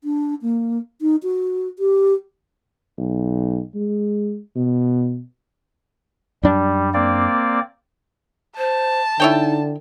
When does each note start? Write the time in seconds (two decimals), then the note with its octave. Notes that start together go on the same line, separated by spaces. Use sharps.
0.04 D4
0.42 A#3
1.01 D#4
1.23 F#4
1.79 G4
2.98 B1
3.75 G#3
4.56 B2
6.43 F#2 G3 D4
6.94 A#3 C4 D5
8.58 C5 A5
9.20 D3 D#4 E4 C#5 G5